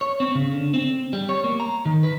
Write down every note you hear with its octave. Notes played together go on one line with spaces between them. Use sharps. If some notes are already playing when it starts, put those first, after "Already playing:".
C#5
C4
C#3
D3
C4
G3
C#5
A#3
A#5
D#3
B4